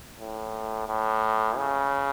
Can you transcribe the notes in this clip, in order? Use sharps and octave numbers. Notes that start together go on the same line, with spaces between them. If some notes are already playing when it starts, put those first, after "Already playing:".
A2
A2
C#3